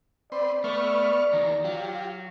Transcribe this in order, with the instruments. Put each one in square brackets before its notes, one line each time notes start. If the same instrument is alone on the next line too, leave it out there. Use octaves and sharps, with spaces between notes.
[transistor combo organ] C4 B4 C6 [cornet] D5
[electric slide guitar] A3 [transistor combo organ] B3 C#6 F6 [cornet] D5
[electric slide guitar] E2 D#3 [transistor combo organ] A#5
[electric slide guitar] F#3 [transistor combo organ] F4 G4